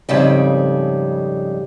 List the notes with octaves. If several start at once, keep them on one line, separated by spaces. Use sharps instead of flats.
F2 G#2 C#3 G3